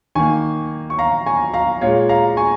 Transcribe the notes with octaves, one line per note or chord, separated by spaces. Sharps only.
D#3 A#3 G#5 C#6
C#6
F5 A#5
G#5 C#6
F5 A#5
A#2 G#3 C#5 F5
F5 A#5
G#5 C#6